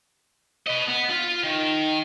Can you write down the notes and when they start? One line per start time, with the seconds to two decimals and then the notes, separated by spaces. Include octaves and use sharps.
0.67 B4 D#5
0.88 B3
1.10 F4
1.43 D#3